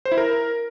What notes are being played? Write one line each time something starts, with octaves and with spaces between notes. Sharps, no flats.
C5
E4
A#4